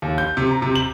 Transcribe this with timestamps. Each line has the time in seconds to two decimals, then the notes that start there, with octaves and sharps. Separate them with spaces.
0.02 D#2
0.18 G6
0.37 C3
0.51 A#5
0.62 C3
0.75 F#7